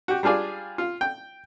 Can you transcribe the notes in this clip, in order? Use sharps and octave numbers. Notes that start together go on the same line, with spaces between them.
F#4 G4
G3 D4 F4 G#4 D5
F4
G5